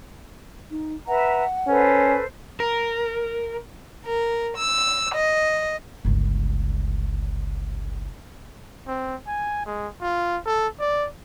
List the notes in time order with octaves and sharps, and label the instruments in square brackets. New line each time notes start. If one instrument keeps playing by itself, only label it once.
[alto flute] D#4
[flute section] B4 E5 A#5 [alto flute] F#5
[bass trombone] C#4 [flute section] A4 B4 C5
[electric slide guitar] A#4
[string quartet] A#4
E6
D#5
[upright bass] G1 C#2
[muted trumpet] C4
G#5
G#3
F4
A4
D5